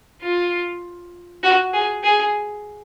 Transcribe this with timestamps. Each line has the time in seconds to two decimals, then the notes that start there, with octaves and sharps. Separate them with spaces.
0.21 F4
1.43 F#4
1.74 G#4
2.03 G#4